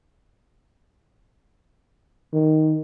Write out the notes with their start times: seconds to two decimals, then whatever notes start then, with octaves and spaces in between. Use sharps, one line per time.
2.33 D#3